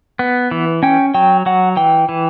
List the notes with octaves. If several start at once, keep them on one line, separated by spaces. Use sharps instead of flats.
B3
E3
C#4 G5
F#3 G5
F#3 F#5
E3 G5
E3